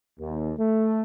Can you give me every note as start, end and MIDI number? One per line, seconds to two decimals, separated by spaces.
0.19 0.53 39
0.58 1.02 57